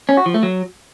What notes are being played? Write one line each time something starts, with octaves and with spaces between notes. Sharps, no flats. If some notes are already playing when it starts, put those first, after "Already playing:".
C#4
F#4
F3
A3
F#3